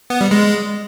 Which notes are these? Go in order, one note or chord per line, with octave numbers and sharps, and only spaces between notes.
B3
G3
G#3